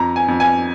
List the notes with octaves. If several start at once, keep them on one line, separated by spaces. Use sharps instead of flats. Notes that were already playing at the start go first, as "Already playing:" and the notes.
Already playing: F2 A#5
G#5
F2
G#5